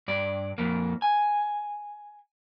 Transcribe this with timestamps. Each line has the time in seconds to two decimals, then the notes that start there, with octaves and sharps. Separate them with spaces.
0.08 G2 D5
0.58 F2 A#3
1.02 G#5